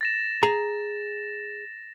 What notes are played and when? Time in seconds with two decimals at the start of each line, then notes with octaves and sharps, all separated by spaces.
0.01 A6 A#6 E7
0.43 G#4 A#5